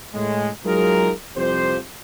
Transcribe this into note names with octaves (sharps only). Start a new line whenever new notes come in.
A2 G#3
F#3 G#3 D#4 F4 G#4 A#4
C2 F2 F3 G4 C5